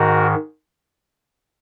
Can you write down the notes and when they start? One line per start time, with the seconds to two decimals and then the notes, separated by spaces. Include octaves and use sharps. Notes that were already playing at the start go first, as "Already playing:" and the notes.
Already playing: G#2 D#3 F#4 A#4